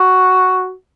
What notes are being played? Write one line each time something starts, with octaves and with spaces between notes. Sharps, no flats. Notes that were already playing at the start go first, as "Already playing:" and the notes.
Already playing: F#4